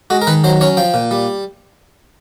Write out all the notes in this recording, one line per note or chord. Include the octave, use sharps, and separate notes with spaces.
G#3 F#4
A#4
D#3 B4
F#3 C5
C#4 C#5
F3 G5
A#2
G3